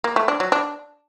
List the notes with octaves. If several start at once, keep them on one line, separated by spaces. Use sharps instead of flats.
A#3
A3
D4
F#3
D4